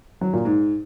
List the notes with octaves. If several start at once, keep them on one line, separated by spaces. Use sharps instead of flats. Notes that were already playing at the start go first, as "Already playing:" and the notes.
F#3
A#2
G#2